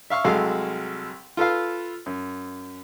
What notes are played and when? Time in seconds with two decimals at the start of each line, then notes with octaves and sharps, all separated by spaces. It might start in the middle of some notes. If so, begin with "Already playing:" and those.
0.10 E5 F5 C#6 F6
0.24 C2 F#3 G#3 A4 F5 F6
1.37 F4 A4 B4 F5
2.06 F#2